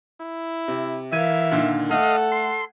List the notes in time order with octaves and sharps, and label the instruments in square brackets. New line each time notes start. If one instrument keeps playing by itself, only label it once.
[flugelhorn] E4
[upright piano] C3
[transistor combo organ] E3 [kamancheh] A#4 F5 [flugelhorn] E5 [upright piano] G#6 D#7
[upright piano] A#2 D3 D#3
[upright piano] A3 [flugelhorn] A4 [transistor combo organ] D#5 F5 [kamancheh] F#5
[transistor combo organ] C6